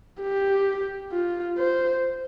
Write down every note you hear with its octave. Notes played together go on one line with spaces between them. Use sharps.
G4
F4
C5